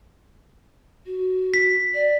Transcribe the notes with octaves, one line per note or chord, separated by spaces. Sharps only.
F#4
B6
D5